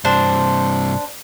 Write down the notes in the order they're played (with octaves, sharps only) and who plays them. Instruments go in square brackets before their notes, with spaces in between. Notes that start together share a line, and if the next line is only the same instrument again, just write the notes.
[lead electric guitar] G2 C3 [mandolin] D4 C5